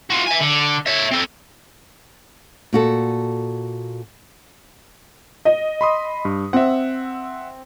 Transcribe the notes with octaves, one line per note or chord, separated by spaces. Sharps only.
F4 F#4
E5 G#5
D3
C#5 E5
C4 A4
A#2 F#4 A4
D#5
B5 C6 D#6
G2
C4 E5 F#5